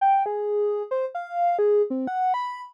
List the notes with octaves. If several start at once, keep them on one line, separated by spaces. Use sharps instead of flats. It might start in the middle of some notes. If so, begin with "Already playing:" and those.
G5
G#4
C5
F5
G#4
C4
F#5
B5